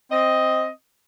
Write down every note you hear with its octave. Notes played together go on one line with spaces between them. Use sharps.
C4 D#5